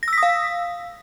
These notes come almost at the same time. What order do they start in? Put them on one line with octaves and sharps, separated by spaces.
A#6 E6 B6 D#6 F5